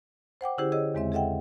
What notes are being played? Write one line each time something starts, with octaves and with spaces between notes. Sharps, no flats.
C5 F#5 G5 D6
D3 C#4 E4 G4 G#4 C5
G#4 C#5 D#5 E6
E2 C#3 G#3 C4 E5
G#4 A4 D#5 E5 F#5 G5